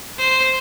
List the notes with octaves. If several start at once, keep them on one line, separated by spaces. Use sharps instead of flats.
C5